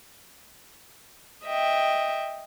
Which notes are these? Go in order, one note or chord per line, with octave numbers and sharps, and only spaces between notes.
D#5 E5 G5